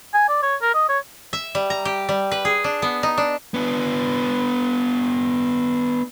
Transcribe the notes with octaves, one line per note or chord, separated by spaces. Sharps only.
G#5
D5
C#5
A#4
D#5
C#5
E5
G3
A#5
G4
G3
B4
G#4
D4
B3
D#4
D4
B3 D4